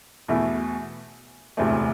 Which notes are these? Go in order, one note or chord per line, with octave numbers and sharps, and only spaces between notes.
E2 B2 A3 E4
E1 D2 C3 E3 A3